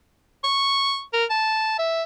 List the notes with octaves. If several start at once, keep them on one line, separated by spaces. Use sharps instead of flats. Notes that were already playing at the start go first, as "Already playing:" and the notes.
C#6
A#4
A5
E5